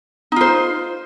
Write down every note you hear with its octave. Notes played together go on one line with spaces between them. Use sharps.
D#4 F4 C5